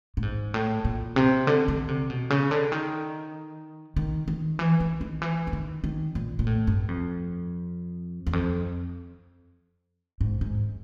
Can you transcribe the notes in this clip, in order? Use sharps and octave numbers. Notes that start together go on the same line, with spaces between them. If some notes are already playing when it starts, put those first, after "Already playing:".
A2
G#2
A2
A#2
C3
D3
D3
C3
B2
C#3
D3
D#3
D#3
D#3
E3
E3
D#3
E3
E3
D#3
D#3
A#2
A#2
A2
G2
F2
E2
F2
G#2
G#2